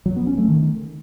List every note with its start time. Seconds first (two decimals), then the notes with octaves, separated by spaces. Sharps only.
0.06 F#3
0.16 B3
0.27 C#4
0.38 A3
0.48 D#3